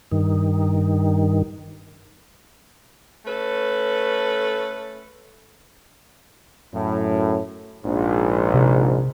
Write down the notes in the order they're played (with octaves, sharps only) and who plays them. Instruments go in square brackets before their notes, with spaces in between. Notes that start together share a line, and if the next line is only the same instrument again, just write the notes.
[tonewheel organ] G2 D#3
[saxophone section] A3 C#4 A4 B4
[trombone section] F#2 A2
A#1 G#2
[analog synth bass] C3